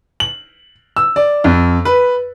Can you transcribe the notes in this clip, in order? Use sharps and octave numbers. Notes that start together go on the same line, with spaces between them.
F#7
E6
D5
F2
B4